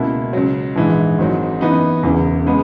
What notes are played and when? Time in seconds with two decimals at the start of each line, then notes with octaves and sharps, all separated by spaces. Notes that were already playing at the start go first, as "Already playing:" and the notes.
Already playing: C#2 B2 A#3 E4
0.33 C#2 C#3 F#3
0.76 A#1 G#2 E3 G#3
1.18 G#1 G#2 F#3
1.61 F#2 E3 B3 D#4
2.03 E1 E2 C#3 E3
2.46 C#3 G#3 B3